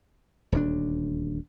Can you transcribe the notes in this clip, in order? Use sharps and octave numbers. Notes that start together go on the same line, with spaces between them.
D#1 D2 G#3 D4